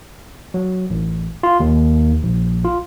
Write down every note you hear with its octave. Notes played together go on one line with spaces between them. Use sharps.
F#3
A1
F4
D#2
A#1
F4